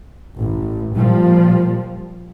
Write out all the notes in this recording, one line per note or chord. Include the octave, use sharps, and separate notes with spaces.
A1
A#2 F3 G3